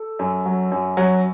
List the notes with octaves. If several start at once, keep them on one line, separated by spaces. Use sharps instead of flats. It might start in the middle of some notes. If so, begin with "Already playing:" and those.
Already playing: A4
F#2
F#3
F#2
F#3